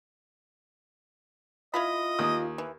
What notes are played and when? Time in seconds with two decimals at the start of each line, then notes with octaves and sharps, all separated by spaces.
1.74 E4 F4 D#5 F5 B5
2.19 D#2 D#6
2.58 E3